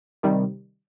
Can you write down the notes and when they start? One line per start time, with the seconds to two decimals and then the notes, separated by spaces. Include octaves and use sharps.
0.23 C3 D#3 G3